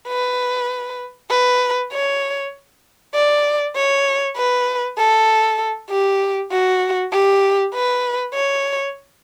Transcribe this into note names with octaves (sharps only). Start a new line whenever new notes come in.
B4
B4
C#5
D5
C#5
B4
A4
G4
F#4
G4
B4
C#5